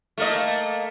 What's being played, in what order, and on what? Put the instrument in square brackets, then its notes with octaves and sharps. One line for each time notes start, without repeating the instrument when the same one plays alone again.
[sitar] A3 A#3 D#5